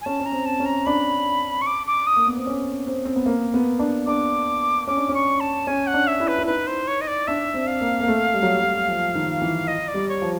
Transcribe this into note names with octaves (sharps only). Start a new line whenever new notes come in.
G#5
C#4 A5
C#4
A#5
C4
A5
C#4
A#5
D4 B5
C#6
D6
D6
D#6
A#3
B3
C4
C#4
C4
C4
B3
A#3
B3
D4
D4 D6
C#4 D6
D4
C#4
C#6
A5
C#4 G#5
F#5
D4
E5
E4
B4
E4
D#4 B4
C5
C#5
D#5
D5
D4 E5
C4
F5
A#3
A#3
A3
G3
F#3
G3
F#3
F3
D#3
E3
D#5
D5
G3
C#5
F3